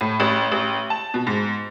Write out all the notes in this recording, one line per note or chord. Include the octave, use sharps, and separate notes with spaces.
A2
A1
A1
A5
B2
G#2